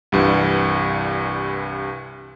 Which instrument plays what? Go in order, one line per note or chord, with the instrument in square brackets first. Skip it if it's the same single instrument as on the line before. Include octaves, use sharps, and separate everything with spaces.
[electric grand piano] C2 G2 E3